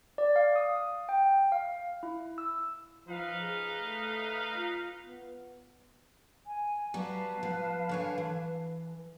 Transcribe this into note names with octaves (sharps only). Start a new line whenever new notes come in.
D5
F5
D#6
G5
F5
E4
E6
F3 D#4 B4 F5
G#4
A3
F4
B3
G#5
F#3 G3 B3 B4 F5 A5
F3
D3 C#5 G#5
E3